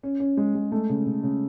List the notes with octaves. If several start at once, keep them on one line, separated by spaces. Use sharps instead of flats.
C#4
C#4
G#3
G#3
A3
C#3
C#3
C#3